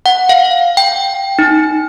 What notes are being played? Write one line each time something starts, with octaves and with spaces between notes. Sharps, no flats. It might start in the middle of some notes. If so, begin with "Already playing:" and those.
F#5
F5
G5
D#4